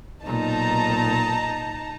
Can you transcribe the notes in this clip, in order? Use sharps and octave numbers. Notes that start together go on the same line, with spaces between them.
B1 A#2 D#4 A5 A#5